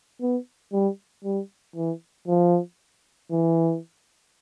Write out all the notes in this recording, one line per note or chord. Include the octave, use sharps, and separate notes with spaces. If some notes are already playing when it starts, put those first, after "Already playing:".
B3
G3
G3
E3
F3
E3